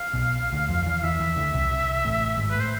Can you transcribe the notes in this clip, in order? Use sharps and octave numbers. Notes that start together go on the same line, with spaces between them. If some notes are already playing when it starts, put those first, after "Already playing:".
Already playing: F5
B1 B2
D2 D3
F2 F3
E2 E3
E2 E3 E5
E2 E3
D2 D3
C2 C3
C2 C3
A1 A2
G#1 G#2
A2 B4
C5